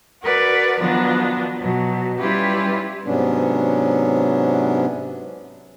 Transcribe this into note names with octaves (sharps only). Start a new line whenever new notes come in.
F#4 A#4 B4 D5
D#3 F3 F#3 B3 D4
B2 F#3
G3 C#4 E4 F4 G4 B4
G#2 C3 F#3 B3 C#4 D4